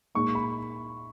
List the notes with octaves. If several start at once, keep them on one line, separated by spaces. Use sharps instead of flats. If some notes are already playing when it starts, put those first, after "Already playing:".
A#2 G#3 D#4 C#6
B5